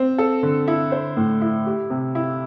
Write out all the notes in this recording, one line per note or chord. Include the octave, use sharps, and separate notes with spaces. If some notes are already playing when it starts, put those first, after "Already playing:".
Already playing: C4
A4
D3
E4
C5
A2
E4
G4
C3
E4